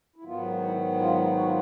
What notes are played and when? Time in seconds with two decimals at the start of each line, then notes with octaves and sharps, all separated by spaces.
0.16 E4
0.24 G#2 D#3 F#3 B3 F4
0.62 E4
0.99 F4
1.35 F#4
1.44 F4